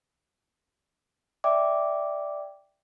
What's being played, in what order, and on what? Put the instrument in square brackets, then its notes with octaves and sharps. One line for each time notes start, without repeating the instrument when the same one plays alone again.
[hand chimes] D5 E5 G5 D6